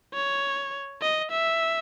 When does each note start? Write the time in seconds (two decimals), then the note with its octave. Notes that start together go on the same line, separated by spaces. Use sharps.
0.14 C#5
1.02 D#5
1.31 E5